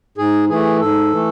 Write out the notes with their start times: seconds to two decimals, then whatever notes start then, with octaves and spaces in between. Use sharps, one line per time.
0.18 G#2 G#4
0.49 E3 A3 G#4
0.80 G#2 A4
1.12 E3 A3